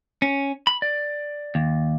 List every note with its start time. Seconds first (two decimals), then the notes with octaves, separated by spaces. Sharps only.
0.22 C#4
0.67 B5
0.82 D5
1.55 D#2